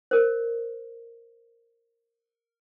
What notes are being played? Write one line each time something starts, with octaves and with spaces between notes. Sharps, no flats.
A#4 C5